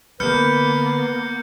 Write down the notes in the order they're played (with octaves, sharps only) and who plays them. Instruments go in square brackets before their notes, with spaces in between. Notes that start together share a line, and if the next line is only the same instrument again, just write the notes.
[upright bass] D3 [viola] A#3 B3 [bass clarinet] B4 [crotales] F6 G6 C#7